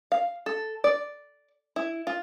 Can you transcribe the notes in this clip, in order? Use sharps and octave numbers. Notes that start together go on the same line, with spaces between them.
F5
A4
D5
E4
F4